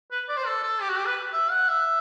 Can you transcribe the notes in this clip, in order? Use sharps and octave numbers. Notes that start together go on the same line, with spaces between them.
B4
D5
C5
A4
A4
G4
F#4
G4
B4
E5
F#5
E5